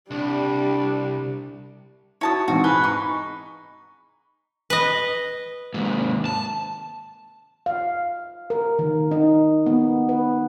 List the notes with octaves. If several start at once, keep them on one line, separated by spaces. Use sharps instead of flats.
C2 G3 D4
E4 F#4 C#5 A5 D#6
G#2 E3 C4 F#4
G#4 B4 F5 G7
D#4 B5 C#6
B4 D#5
D#2 G#2
A5
F5
A#4
D#3
D#4
B3
B4